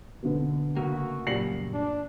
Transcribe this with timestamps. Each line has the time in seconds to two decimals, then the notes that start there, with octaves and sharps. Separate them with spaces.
0.22 B2 D3 B3
0.77 C#3 A3 A#3 F#4
1.27 F#2 A#2 G3 A#6 C7 F#7
1.73 D4